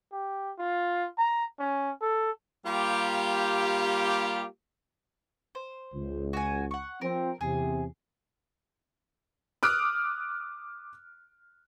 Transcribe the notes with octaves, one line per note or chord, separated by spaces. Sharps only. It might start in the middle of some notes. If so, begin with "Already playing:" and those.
G4
F4
A#5
C#4
A4
G3 A#3 F4 G4
C5
C#2
F#4 G#5
F#5 C#6
F3 C4 A#4
E2 C3 G#4
D6 D#6 F6 F#6 D7